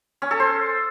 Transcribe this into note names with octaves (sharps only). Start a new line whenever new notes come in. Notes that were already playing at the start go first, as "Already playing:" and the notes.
C#4
A4
C5